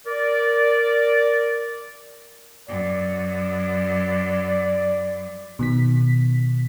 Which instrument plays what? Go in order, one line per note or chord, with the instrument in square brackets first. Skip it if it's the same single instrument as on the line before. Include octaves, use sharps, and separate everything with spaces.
[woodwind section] A#4 D5
[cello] F#2 [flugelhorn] D5
[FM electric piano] B2 D#3 B6